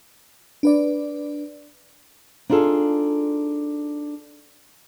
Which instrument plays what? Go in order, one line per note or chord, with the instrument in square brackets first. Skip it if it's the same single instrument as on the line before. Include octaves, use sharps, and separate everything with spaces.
[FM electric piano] D4 B4 D5
[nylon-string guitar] D4 D#4 F4 G#4 A4